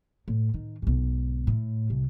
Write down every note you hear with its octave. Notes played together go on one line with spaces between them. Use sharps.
A2
D#3
B1 G#2
A2
C2